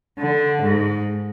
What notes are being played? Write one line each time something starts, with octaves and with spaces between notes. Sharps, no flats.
D3
G#2